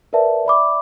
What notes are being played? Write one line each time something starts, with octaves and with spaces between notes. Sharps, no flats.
A#4 B4 D5 E5 A5
D5 E5 B5 D6